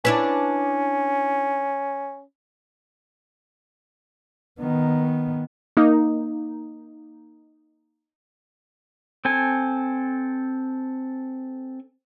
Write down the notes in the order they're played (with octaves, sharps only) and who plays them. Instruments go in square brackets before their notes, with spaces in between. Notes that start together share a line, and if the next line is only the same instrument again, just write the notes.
[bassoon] C#4 [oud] D4 E4 B4
[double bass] D#3 B3
[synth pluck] A#3 D#4
[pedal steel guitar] C4 A4 G#5